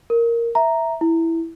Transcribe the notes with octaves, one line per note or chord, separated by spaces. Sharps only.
A#4
E5 A#5
E4